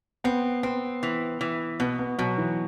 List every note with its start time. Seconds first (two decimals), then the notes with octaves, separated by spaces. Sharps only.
0.24 B3 C4
0.63 B3 C4
1.03 E3
1.41 E3
1.80 B2 B3
1.99 B3
2.18 B2 F#3
2.38 E3